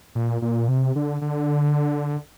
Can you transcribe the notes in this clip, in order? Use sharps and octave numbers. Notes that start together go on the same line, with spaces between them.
A#2
A#2
C3
D3
D3